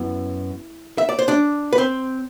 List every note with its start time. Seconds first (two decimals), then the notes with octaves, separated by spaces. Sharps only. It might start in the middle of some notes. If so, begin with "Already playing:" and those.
Already playing: F#2 B3 E4
0.98 E5
1.09 D5
1.19 C5
1.28 D4 D5
1.73 B4
1.78 C4 C5